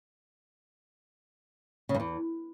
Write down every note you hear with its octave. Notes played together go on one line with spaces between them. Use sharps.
C#3
G2
E2